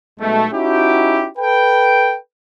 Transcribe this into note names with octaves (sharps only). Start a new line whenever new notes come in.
B1 B2 G#3 A3
C#4 D#4 E4 F#4 G4
A4 B4 G5